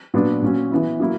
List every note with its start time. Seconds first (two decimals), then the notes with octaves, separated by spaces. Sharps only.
0.14 A#2 F#3 B3 D4
0.42 A#2 F#3 C#4
0.71 E3 B3 E4
1.00 F#3 A#3 E4